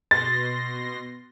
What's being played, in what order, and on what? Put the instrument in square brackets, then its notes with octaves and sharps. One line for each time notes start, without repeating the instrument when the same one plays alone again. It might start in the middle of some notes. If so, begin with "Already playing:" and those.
[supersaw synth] B2 C6 A#6 [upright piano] A6